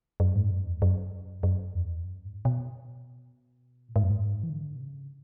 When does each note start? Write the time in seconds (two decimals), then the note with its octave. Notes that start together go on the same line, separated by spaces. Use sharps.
0.20 F#2
0.36 G#2
0.51 F#2
0.66 E2
0.82 F#2
1.43 F#2
1.74 E2
2.04 F#2
2.25 G#2
2.45 B2
3.89 A2
3.96 G#2
4.03 F#2
4.10 G#2
4.43 E3
4.50 D3
4.76 B2
4.81 C#3